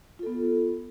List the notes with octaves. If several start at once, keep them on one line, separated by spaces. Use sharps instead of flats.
B3 F4 A4